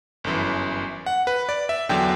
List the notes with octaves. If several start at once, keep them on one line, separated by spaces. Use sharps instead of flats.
G1 F#2 E3
F#5
B4
D5
E5
E2 D3 F#3 G5